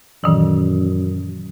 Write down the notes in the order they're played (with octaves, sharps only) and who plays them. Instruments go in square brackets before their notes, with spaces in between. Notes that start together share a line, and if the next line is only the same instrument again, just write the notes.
[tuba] F#2 [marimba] A#2 D#3 E3